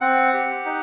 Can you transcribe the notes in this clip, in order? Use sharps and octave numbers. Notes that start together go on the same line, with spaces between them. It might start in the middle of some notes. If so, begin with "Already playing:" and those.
C4 F#5
G4
D#4